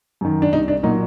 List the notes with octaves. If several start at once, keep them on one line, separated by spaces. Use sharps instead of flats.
F#2 D#3
D4
C2 D#4
D4
A#2 F#3 A#3 D#4